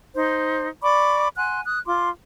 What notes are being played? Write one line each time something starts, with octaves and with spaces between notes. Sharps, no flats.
D#4 C5
D5 B5 C#6 D6
F#5 G#5 C6 F#6
D#6 F#6
F4 C6 D6